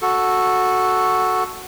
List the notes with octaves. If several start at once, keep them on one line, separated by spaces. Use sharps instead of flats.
F#4 A4